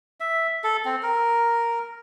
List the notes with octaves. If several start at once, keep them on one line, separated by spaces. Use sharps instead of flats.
E5
A4
C4
A#4